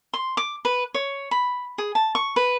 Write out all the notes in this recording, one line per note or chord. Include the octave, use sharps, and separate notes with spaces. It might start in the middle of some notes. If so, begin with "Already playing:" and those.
C6
D6
B4
C#5
B5
G#4
A5
C#6
B4